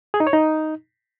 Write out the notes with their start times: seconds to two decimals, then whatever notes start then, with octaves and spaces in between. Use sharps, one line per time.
0.14 G#4
0.20 D#4
0.27 C#5
0.33 D#4